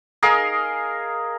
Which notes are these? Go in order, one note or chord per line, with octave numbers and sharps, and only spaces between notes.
G#4 A#4 D#5 F5